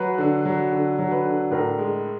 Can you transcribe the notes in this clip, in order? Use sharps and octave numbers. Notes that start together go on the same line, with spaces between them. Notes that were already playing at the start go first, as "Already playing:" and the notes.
Already playing: F#3 B4
D3
F#3
D3
F#3
B4
D3
A2 A#4
G#3